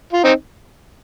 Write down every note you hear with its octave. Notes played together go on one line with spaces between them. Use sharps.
F4
C4 D#4